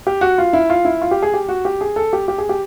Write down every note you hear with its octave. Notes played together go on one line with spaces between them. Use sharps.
G4
F#4
F4
E4
F4
E4
F4
G4
G#4
G4
F#4
G4
G#4
A4
G4
G4
G#4
G4